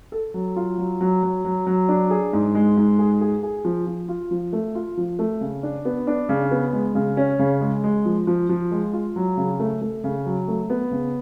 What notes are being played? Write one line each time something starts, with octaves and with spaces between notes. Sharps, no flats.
A4
F#3
F4
F#3
F#3
F#3
F#3
F#3
D4
G#4
G#2
G#3
G#2
G#4
G#4
G#4
F3
F3
F4
F3
A3
F4
F3
A3
C#3
D4
B3
D4
C#3
B3
G#3
C#3
C#4
C#3
G#3
G#3
F3
F3
F3
G#3
F4
F#3
C#3
A3
A3
C#3
F#3
A3
B3
C#3